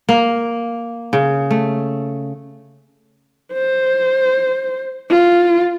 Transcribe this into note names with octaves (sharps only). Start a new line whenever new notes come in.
A#3
C#3
A3
C5
F4